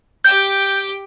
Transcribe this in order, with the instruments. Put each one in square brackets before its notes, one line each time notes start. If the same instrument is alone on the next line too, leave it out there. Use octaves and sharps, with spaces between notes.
[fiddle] G4 G5 [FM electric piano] G6